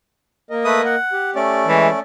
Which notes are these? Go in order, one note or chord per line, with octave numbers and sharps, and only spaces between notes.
A#3 A#4 D#5
A3 B4 D#6
F#5
G4
A3 C#4 D5
E3 G#3